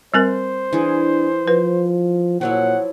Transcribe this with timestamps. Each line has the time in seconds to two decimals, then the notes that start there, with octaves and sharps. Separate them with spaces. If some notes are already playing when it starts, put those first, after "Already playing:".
0.14 G3 C4 A#4 C5
0.73 E3 D4 G#4
1.48 F3 B4
2.41 A#2 F3 F#3 E4 F#5